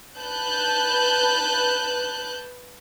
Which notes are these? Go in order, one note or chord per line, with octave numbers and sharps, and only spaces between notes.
B4 A5 F#6 G6